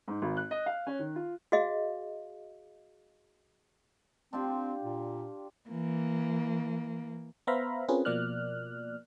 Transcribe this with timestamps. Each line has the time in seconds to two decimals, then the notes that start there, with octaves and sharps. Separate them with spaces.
0.08 G#2
0.22 G#1
0.37 F#6
0.51 D#5
0.66 F5
0.87 C#4
0.99 D#3
1.16 F4
1.52 F#4 G#4 D#5 F5
4.33 C4 D4 F4 G4
4.83 A#2
5.69 E3 A#3
7.47 B3 C5 E5 F5 A#5 B5
7.88 C4 C#4 F4 G#4 A#4 B4
8.05 B2 F3 A#3 D5 F6 F#6